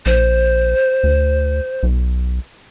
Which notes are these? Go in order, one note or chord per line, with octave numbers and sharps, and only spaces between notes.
A#1 C5
D2
B1